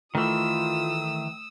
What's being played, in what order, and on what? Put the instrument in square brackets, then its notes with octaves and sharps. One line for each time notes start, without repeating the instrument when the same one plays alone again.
[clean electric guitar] D#3 E3 [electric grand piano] A3 [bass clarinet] F4 [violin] D#6 E6